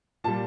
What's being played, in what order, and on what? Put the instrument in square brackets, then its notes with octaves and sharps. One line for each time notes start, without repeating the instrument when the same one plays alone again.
[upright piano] A#2 G3 A5